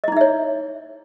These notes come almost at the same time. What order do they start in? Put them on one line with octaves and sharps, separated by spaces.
D#5 E4 D#4 E5 C#5